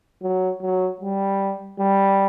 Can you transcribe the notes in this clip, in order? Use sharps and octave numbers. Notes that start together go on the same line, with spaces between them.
F#3
F#3
G3
G3